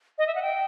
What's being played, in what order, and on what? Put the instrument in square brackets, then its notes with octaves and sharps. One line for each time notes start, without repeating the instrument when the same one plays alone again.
[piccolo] D#5
E5
F#5
G5